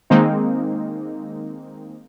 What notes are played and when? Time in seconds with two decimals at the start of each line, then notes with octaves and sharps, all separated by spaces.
0.10 D#3 G#3 A#3 C4 D#4